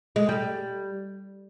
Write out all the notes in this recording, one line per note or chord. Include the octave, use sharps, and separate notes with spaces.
G#3
G3